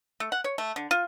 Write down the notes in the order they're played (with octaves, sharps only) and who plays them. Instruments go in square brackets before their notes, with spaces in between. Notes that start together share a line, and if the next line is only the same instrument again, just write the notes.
[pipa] A3
F#5
C#5
A3
D3
F4